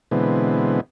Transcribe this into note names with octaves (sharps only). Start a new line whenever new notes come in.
B2 D3 E3 G#3 B3 C4